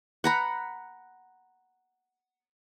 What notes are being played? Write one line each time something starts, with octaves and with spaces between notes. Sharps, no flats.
F#5 A#5 B5